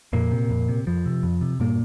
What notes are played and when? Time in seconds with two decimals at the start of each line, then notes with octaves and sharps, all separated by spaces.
0.13 F2 A#2 A#3
0.32 C3
0.50 F2
0.69 C3
0.87 F2 F3
1.06 C3
1.23 F2
1.41 C3
1.60 G2 A#2 A#3